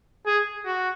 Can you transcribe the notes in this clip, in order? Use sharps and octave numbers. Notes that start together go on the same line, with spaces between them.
G#4
F#4